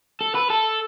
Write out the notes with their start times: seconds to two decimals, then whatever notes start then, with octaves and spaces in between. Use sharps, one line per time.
0.21 A4
0.35 B4
0.50 A4